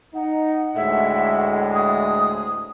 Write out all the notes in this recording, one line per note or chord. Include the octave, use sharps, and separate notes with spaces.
D#4 F#5
D2 A2 G#3 E5
D#6